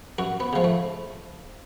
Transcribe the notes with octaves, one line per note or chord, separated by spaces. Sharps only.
F#2 F#4
B3
C#3 F3 G#3
A3